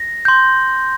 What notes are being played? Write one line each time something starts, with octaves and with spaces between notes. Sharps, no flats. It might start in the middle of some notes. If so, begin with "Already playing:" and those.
Already playing: A#6
C6 G6